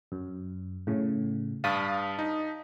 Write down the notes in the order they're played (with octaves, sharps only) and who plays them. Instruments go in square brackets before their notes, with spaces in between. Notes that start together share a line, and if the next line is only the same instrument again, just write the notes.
[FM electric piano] F#2
A2 C#3
[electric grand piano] G2 F5 [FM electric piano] A5 D#6 B6
[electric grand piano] D#4